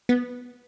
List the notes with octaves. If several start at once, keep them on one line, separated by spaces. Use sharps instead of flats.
B3